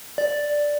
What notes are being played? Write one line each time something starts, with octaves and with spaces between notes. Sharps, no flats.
D5